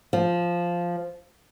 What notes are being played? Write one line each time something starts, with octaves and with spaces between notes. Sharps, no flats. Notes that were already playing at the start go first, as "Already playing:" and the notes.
F3